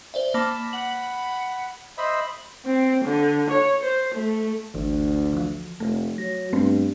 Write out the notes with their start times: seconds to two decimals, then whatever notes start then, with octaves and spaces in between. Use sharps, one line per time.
0.14 C5 D5 E5
0.34 A#3 A5 B5 D6
0.73 F#5 F#7
1.98 C5 D#5 E5 B5
2.65 C4
3.05 D3
3.50 C#5
3.83 C5
4.14 A3
4.74 G#1 D2 E3
5.33 E3 F3
5.80 F1 A3
6.18 F#3 A#6
6.53 G2 A3 B3 C4